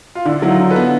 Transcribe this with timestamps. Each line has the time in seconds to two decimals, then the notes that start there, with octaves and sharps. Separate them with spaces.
0.15 F4
0.25 D3 D4 E4
0.42 F#3 E4
0.48 D#4 F4
0.60 D3
0.70 A4 B4
0.76 B3